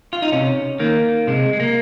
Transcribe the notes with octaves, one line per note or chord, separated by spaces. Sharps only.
F4
D#4
C3 C#4
D#3 A#3
C3 G#3
G#3
A#3